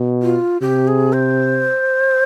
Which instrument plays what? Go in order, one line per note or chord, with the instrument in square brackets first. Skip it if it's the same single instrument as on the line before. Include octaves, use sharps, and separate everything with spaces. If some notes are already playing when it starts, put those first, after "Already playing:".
Already playing: [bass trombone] B2
[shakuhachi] F4
[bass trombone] C3 [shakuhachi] G4
[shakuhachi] G#4
C5